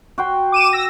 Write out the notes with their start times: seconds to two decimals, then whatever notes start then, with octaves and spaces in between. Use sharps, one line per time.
0.18 F#4 G5 C6
0.52 D6 D#7 E7
0.73 E6 A#6